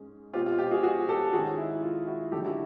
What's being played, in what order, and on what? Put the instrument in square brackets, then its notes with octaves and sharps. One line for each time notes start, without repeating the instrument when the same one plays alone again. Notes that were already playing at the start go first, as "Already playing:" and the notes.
Already playing: [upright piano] G#2 G#3 C#4
B2 G#3 C4 F4 G4
F4
F4 G4
F#4 G#4
F#4 G#4
G4 A4
G#2 D#3 G#3 C#4 F#4 G#4
E4
F4
E4 F#4
F#2 D3 F#3 G4 A4
E4 F#4